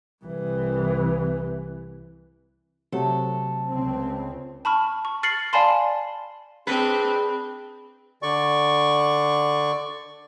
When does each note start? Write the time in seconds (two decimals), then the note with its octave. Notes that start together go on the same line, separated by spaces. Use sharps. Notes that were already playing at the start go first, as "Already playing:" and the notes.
0.24 C2 E3
2.92 C3 F#3 A3 A4
3.67 C#2 C4
4.65 A5 B5 C#6 F6
5.05 C#6
5.23 F6 A6 C7 C#7 F#7
5.53 D5 F5 G#5 A5 B5 C6
6.67 C4 D4 G#4 B4
8.22 D3 D5 C#6